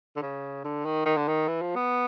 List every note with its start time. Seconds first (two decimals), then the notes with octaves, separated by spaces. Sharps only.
0.16 D3
0.22 C#3
0.64 D3
0.85 D#3
1.06 D#3
1.17 D3
1.28 D#3
1.48 E3
1.62 F3
1.76 B3